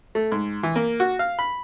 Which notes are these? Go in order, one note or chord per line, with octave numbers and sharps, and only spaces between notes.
A3
G#2
E3
A#3
F#4
F5
B5